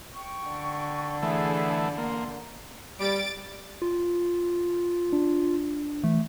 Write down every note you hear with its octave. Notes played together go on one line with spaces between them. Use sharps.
G5 C#6
D3
E3 A3 G#4 E5
A#3 C6
G3 A6 D7
F4
D4
E3 A3